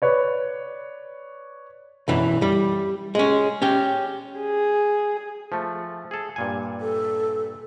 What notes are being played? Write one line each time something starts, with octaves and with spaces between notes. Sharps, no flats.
B4 C#5 D5
B1 F#2 E3
G3
G#3 C#4
C#4 G4
G#4
F3 A3
G#4 A4
G2 A#2 G#5
A4